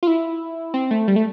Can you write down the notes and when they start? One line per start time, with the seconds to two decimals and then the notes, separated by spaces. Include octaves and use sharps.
0.03 F4
0.07 E4
0.74 C4
0.91 A3
1.08 G3
1.16 A3